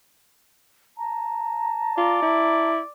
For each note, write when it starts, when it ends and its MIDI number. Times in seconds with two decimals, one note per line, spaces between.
0.97 2.68 81
0.97 2.68 82
1.98 2.19 65
1.98 2.92 74
2.22 2.80 64